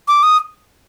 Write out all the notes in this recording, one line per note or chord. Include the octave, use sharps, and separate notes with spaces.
D6
D#6